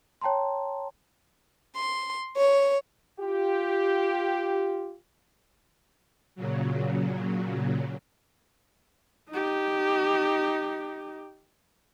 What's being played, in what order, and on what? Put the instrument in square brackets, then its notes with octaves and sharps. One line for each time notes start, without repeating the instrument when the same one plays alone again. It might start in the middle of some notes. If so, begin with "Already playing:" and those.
[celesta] C#5 G5 A5 A#5 C6
[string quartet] C6
C#5
[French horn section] F4 G4
[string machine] A#2 C#3 F#3
[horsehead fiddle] D#4 G4